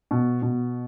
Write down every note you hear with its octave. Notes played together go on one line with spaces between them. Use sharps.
B2
B2